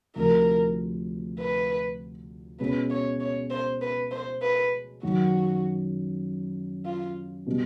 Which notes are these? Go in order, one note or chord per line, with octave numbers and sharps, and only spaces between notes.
D2 C3 F3 A#4
B4
B2 G#3 C#4 B4
C#5
C#5
C5
B4
C5
B4
F#2 D#3 F#3 F#4
F4
B2 G3